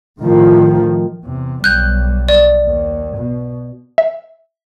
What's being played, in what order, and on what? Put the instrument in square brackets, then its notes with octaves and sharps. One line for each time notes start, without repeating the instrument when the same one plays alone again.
[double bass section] A2 D#3 F3
[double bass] E2 C3
[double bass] B1 G3 [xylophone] F#6 G6
[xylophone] D5
[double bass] D#2
B2
[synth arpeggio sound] E5